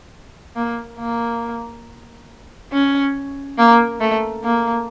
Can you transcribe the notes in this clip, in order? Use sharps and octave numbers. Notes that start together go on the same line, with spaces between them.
A#3
A#3
C#4
A#3
A3
A#3